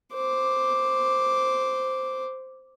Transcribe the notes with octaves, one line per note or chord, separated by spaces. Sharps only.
C5 D6